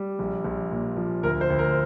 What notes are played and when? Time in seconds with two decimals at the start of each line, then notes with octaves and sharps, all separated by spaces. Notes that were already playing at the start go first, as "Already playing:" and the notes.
Already playing: G3
0.19 A#1
0.44 A#1
0.71 A#2
0.97 F3
1.23 D2 A#4
1.41 C5
1.50 D2
1.59 A#4